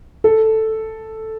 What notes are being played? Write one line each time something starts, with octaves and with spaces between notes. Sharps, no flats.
A4